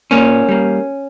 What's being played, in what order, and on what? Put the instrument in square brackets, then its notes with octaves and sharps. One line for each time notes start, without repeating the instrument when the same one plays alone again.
[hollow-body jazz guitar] A#2 A#3 C#4
G3 A#3